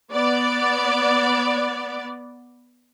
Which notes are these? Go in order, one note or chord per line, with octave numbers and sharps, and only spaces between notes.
B3 D5